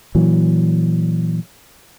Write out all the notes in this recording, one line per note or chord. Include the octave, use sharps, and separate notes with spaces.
A#2 E3 F#3